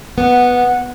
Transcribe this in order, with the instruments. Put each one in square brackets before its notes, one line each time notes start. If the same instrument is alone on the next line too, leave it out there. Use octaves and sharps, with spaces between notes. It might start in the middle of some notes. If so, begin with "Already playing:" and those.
[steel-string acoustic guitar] B3 [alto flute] F#5